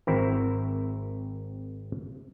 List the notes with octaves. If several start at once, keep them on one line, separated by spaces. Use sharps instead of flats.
G#1 C4 E4 F#4 A#4 E5